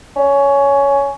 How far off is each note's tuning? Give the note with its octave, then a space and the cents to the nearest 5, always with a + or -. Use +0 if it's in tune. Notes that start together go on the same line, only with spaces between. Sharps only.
C#4 +15